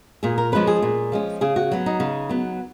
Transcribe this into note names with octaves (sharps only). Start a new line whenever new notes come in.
A#2 G#4
A#4
F3 G#3 C#4 B4
G#4
A#2
F3 G#3 C#4
C#3 G#4
F#4
F#3 B3
D#4
C#3
F#3 B3